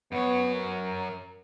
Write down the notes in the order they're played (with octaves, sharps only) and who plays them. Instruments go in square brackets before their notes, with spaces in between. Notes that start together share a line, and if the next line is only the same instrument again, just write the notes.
[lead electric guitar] F#2 C#5 [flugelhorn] B3
[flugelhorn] A#4